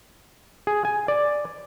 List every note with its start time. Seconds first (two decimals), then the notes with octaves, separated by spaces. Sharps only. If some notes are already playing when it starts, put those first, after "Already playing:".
0.67 G#4
0.85 G#5
1.08 D5